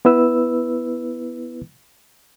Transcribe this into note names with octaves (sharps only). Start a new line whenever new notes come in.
B3 E4 B4 E6